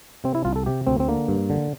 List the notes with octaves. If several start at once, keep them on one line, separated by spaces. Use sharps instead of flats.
C3 C4
E4
C2 F4
A4
C3 G4
D2 C4
C4
D3 A#3
G2
D3